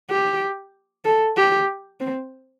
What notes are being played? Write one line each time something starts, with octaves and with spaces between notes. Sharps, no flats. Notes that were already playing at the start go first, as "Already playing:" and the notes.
G4
A4
G4
C4